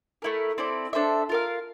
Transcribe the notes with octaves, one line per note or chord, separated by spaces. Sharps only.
A3 E4 A#4
C4 E4 A4 D5
D4 A4 C5 E5
F4 A#4 F5